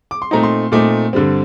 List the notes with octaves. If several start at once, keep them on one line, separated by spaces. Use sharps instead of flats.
D6
C6
A#2 A3 C4 D#4 A#5
C6
A#2 A3 C4 D#4 D6
G2 D3 G3 C4